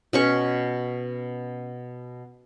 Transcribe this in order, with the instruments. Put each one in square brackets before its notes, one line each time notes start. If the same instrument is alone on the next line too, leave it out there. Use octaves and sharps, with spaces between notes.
[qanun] B2 C#4 C#6